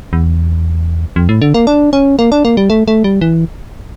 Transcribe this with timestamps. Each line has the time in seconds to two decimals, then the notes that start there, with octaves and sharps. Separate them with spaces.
0.13 E2
1.16 F2
1.29 A2
1.42 D3
1.54 A#3
1.67 D4
1.93 C#4
2.19 A#3
2.32 D4
2.45 A#3
2.57 G3
2.70 A3
2.88 A3
3.04 G3
3.21 E3